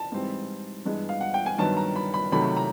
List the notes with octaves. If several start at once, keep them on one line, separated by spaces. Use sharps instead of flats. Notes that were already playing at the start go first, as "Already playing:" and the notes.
Already playing: A5
G#2 E3 G3 C4
G2 E3 G#3 B3
F5
F#5
G5
G#5
G2 D#3 F#3 B3 A5
A#5
B5
B5
C3 D#3 F#3 A3 B5
A#5